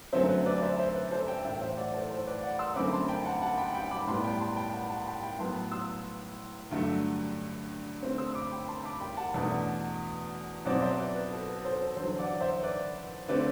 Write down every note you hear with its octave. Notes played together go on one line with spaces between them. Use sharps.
F#2 D3 F#3 A3 C4 C5 E5
B4
B4 D5
C5 E5
C5 E5
B4
A4 C5
E5 G5
A2 E3 A3 E5 G5
C5 E5
D5 F#5
A4 C5
A4 C5
B4 D5
D5 F#5
C6 E6
F#2 D3 A3 C4 B5 D6
A5 C6
G5 B5
F#5 A5
F#5 A5
G5 B5
G5 B5
B5 D6
A2 G3 B3 A5 C6
G5 B5
A5 C6
G5 B5
F#5 A5
F#5 A5
G5 B5
G5 B5
A2 F#3 B3 A5 C6
C6 E6
G2 D3 F#3 A3
D3 A3 C4
C6 E6
B5 D6
G5 B5
A5 C6
B5 D6
G5 B5
F#5 A5
E2 B2 A3 D4
B2 F#3 C4 D5 F#5
C5 E5
B4 D5
B4
A4
B4
A4 C5
A4 C5
E2 D3 F#3 A4 C5
D5 F#5
C5 E5
B4 D5
D3 A3 C4 B4 D5